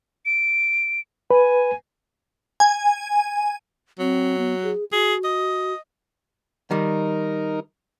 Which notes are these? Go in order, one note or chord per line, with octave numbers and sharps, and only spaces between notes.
D7
B4 G#5
G#5
F#3 C4
B3
G#4
F#4 G#4
D#5
D#3 G3 D#4 A#4